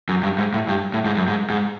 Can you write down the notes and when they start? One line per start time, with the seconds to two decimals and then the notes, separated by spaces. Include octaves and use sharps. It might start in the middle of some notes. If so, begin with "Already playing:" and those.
0.09 F#2
0.23 G2
0.38 G#2
0.54 A2
0.68 G2
0.94 A2
1.05 G#2
1.17 F#2
1.28 G#2
1.50 G#2